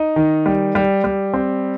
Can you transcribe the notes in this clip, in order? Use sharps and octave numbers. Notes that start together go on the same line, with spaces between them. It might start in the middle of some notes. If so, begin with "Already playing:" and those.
Already playing: D#4
D#3
G3
G3
G3
C4